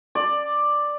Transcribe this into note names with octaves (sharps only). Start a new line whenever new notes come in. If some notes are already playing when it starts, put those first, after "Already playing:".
D5